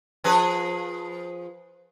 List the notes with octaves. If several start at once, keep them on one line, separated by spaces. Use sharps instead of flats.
F3 G#4 B4